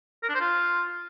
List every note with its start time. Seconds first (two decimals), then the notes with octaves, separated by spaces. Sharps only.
0.23 A#4
0.29 D4
0.35 C5
0.41 F4